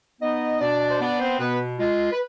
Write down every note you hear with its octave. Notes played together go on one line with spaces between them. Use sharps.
B3 D#4 D#5
B2 D4 D5
C5
B3 D4 D5
C4 C5
B2 B3 B4
G#3 F4
B4